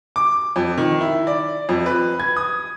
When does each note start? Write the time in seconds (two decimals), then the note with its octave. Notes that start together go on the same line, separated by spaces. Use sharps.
0.16 D6
0.56 F2
0.78 D#3
1.01 E4
1.27 D5
1.69 F2
1.86 B4
2.20 G#6
2.37 D#6